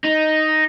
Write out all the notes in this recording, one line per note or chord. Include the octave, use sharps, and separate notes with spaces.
D#4